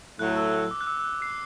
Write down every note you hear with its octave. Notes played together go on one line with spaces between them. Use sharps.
A2 F#3 A3 F#6
E6
D6
F#6
E6
E6
F#6
C7